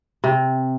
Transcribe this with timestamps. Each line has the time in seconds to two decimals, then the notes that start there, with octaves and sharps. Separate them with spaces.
0.24 C3